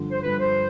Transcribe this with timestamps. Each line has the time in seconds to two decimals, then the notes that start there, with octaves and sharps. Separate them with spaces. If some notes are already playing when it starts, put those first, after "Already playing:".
Already playing: G2 D3 F3
0.11 C5
0.22 G2 D3 F3 B4
0.39 C5